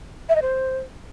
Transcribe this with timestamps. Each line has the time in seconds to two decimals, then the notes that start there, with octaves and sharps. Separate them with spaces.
0.29 E5
0.36 D#5
0.42 C5